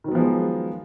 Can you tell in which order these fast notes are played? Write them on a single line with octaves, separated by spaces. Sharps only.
D#3 F#3 B3 F3 G#3